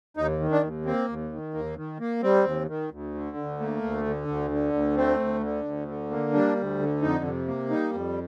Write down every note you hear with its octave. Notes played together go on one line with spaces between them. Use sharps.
D#2 D#4
D#3
D4
D#2
A#3 C4
D#2
D#3
D#2 A#3
D#3
A#3
G3 C4
D#2
D#3
D2
D3
D2
A3 A#3
D2
D3
D2
D3
D2
A3 C4
D2
D3
D2
D3
A#3
G3 D4
D2
D3
F2 D#4
C3
A#3
G3 D#4
F2